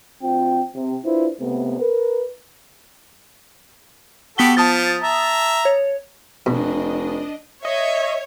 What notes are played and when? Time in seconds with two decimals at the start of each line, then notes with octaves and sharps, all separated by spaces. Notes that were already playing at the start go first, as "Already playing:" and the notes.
0.23 D2 C4 F4 G5
0.75 C3
1.05 D4 E4 F4 B4 C5
1.40 C#2 C3 A3 B3
1.80 A#4 B4
4.38 B3 F#4 G4 A4 B6 G7
4.57 F3 A5 D#6 A6
5.02 E5 A#5
5.65 C#5
6.46 F1 B2 D4 D#5
7.65 C#5 D#5 E5